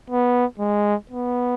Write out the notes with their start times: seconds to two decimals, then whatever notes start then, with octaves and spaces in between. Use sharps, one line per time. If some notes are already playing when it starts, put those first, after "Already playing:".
0.10 B3
0.60 G#3
1.11 B3